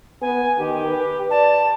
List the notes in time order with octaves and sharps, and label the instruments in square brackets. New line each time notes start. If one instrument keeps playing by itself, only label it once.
[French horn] B3 [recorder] G#5
[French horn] D#3 [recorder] G4
[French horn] B4
[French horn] D5 [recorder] A5